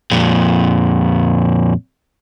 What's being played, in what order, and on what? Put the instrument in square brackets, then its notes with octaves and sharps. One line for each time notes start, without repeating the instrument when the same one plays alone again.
[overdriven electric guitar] F2 A#2